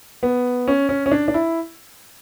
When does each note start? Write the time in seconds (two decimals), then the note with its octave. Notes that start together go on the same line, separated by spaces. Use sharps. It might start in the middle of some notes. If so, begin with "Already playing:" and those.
0.23 B3
0.68 C#4
0.89 C#4
1.06 C#4
1.11 D4
1.28 D4
1.34 E4